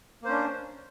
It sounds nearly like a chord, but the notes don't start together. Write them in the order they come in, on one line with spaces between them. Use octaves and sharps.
A#3 C5 C#4 D4